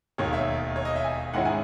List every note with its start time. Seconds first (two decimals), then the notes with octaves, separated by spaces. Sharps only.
0.18 E1 D#2 D#3 C#5
0.33 E5
0.76 C#5
0.85 D#5
0.96 E5
1.04 G#5
1.33 G#2 D#3 G#3 C#4 E4 F#5
1.45 G#5